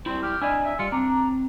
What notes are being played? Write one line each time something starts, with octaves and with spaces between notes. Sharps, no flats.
G3 C4 E4
G4 F6
D4 E4 D5 D#5 G#5
E5
G3 F4 C#7
C4 D4 A#5